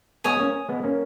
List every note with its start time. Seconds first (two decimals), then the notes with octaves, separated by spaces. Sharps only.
0.24 G#3 B3 C#5 G#5 D#6
0.39 A#3 C#4
0.69 G#3 B3
0.83 A#3 C#4